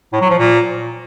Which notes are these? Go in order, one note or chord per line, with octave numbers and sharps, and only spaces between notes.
A2
F#3
F3
A#2